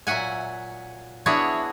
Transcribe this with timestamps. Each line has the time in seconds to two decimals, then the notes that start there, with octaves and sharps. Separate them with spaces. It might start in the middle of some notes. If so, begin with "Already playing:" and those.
0.07 A#2 F#3 E5 F#5 G#5
1.26 B3 D4 E4 F#4 G#4 C#5